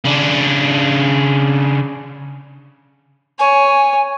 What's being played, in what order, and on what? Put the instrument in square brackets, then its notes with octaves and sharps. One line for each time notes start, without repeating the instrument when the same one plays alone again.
[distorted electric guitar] C#3 D4
[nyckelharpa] C#5 [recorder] G#5